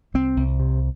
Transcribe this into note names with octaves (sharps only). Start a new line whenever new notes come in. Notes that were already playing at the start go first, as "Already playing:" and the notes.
C2 C4
C2
C3